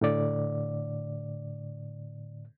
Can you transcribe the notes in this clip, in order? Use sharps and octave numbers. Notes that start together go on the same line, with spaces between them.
A2 D3 D5